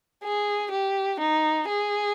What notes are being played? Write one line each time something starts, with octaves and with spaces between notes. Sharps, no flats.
G#4
G4
D#4
G#4